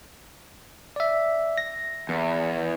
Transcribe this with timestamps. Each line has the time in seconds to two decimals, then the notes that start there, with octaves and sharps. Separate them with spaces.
0.96 D5 E5
1.58 A#6
2.09 E2